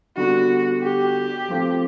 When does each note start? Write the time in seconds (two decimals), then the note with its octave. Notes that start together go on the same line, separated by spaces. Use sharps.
0.17 D3 G3 B3 F#4
0.83 G4
1.48 F3 A3 C4 F4